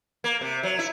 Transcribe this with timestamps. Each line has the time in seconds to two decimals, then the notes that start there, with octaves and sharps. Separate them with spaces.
0.24 A#3
0.41 C3
0.63 F#3
0.79 E4